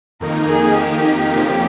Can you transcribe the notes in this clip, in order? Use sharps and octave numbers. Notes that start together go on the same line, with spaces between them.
F2 D#3 A#3 D#4 A#4
G#4
G4
F2 C#3 F3 A#3